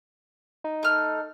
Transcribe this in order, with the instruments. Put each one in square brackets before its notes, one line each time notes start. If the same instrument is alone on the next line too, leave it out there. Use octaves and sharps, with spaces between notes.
[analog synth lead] D#4
[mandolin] A3 F6